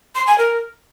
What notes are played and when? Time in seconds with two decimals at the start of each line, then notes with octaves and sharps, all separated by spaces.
0.15 C6
0.27 G#5
0.38 A#4